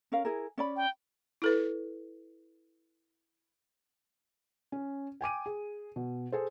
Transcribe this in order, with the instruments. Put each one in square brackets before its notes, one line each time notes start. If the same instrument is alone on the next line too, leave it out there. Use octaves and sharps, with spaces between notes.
[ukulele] C#4 A#4 F5
E4 G#4 A#4
C#4 D5 B5
[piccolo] G5
[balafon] E4 A4 B4
[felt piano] C#4
G5 G#5 D6 D#7
G#4
B2
G#4 A4 C5